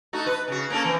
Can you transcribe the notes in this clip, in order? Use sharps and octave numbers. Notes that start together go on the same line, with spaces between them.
A3 D#4 F#4
B4
C#3 F#4
A#3 C#4 A4
E3 C4